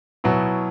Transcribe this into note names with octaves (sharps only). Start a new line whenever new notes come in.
B2 F#3 B3 E4